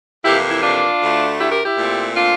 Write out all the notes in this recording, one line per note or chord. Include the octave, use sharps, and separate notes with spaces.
F2 C3 E3 A#3 E4 G4
E4
D4 F4
D2 D3 A3
E4 G4
G4 A#4
E4 G4
A#2 A3 C4
D4 F4